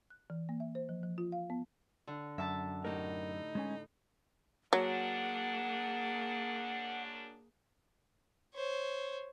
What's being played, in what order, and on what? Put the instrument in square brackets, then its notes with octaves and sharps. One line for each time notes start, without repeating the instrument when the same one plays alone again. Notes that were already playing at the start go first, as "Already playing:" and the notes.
[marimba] F#6
E3
A#3
E5
C5
F3
F3
F4
F5
B3
[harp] D3
[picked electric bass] F#2 [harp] E5 A5
[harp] A2 G4 [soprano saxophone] D#4 [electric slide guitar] A#4
[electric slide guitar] G#3 C#4 G#5
[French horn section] F#2 D4 [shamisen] F#3 [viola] A#3 G#4 [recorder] F#5
[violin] C5 C#5